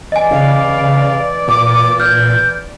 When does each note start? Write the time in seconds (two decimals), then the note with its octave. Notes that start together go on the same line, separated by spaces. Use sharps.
0.12 E3 D5 D#5 G#5
0.31 C#3 F5
1.48 A#2 D6
2.00 F6 G6